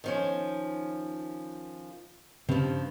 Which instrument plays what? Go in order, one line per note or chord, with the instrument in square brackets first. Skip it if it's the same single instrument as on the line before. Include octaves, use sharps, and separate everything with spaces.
[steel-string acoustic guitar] D#3 F3 C#4
[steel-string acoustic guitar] G2 F3 [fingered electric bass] C#3 C4